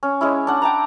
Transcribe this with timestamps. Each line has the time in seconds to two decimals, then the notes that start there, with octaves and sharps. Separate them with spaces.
0.03 C#4
0.21 G#3 C#4 E4
0.47 D4 F#5
0.62 G5 A5 A#5